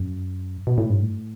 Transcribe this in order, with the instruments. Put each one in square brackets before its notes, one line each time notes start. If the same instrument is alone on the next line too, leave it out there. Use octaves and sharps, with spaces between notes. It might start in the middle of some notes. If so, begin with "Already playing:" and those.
Already playing: [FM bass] F#2
B2
A2
G2
A2